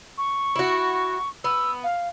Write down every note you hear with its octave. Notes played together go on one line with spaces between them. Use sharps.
C#6
E4 F#4
B3 E6
F5